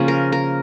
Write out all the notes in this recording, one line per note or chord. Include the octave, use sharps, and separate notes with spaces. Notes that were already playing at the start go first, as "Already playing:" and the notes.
Already playing: C#3 F3 A#3 C#4
A#4
A#4